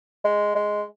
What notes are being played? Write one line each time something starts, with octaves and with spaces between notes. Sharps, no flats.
G#3
G#3